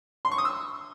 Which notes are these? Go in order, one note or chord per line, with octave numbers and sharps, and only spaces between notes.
C6
C#6
D#6
E6